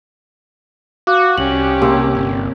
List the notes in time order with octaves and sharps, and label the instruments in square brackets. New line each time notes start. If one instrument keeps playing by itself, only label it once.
[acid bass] F#4 [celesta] F5 D6 F#6
[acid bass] C2 [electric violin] C#4 G4 [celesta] F#7
[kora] C3 A#3
[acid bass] G1